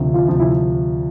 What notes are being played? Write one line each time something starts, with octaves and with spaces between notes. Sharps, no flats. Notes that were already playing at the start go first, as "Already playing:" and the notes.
Already playing: D2 C3 F3
F4
D2 C3 F3
E4